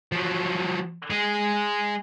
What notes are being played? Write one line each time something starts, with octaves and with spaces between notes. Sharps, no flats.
F3 F#3
G#3 G#4